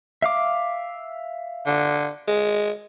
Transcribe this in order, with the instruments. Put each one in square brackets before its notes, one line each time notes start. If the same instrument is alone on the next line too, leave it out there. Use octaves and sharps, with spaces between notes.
[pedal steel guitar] E5 F5 D6
[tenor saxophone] D3
G#3